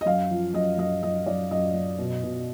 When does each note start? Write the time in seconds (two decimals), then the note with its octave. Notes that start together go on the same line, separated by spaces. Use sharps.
0.01 D#5
0.06 F#2 F5
0.30 F3
0.54 F#2 D#5
0.78 F#2 D#5
1.03 F#2 D#5
1.26 F#2 D5
1.51 F#2 D#5
1.74 F#2
1.99 B2
2.23 B2